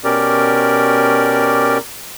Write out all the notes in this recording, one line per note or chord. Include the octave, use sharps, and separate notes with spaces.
B2 C#4 G4 A#4 D5